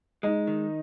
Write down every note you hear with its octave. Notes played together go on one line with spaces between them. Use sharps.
G#3 D#4
D#3